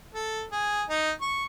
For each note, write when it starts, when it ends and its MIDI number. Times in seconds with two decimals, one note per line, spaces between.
0.15 0.44 69
0.52 0.82 68
0.88 1.11 63
1.21 1.45 85